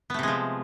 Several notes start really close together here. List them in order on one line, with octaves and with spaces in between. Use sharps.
B3 A3 C3 G#3 F3